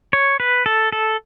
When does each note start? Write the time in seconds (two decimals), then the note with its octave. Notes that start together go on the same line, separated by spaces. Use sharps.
0.13 C#5
0.40 B4
0.66 A4
0.92 A4